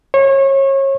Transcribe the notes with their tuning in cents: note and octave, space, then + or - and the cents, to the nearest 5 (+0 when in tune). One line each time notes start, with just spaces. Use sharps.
C#5 -30